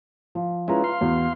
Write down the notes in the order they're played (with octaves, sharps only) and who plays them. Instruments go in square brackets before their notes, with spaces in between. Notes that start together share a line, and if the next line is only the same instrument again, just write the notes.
[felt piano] F3
[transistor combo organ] G#3 C#4 E4 [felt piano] F4 B4 A#5
[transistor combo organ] F5 C6
[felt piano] E2 F#4